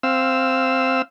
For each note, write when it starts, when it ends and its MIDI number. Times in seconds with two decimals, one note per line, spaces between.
0.03 1.02 60
0.03 1.02 77
0.03 1.02 88